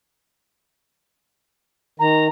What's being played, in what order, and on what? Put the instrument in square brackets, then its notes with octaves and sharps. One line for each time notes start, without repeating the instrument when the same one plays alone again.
[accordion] D#3 [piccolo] A#5